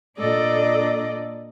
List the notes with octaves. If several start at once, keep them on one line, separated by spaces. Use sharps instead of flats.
A#2 D4 A4 D5 D#5